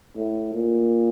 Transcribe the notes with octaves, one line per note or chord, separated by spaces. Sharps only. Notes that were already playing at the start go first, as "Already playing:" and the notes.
A2
A#2